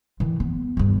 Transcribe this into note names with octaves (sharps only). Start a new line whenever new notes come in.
D#3 E3
B3
G1 G2